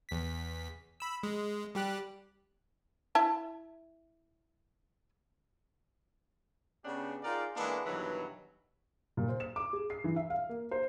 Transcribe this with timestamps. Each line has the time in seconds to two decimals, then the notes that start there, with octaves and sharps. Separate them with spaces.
0.09 E2 B6
1.00 B5 E6
1.23 G#3
1.75 G3 G4 F#6
3.15 E4 E5 A5
6.84 C#3 B3 C#4 D4 G4
7.23 D#4 F4 G#4 A#4 D5 G5
7.57 E3 G#3 A#3 B3 D4 A4
7.86 G2 B2 D#3 E3 F#3
9.17 A#2
9.29 C5
9.40 E7
9.56 D6
9.73 G#4
9.90 C7
10.04 E3
10.16 E5
10.30 F5
10.49 A#3
10.71 C5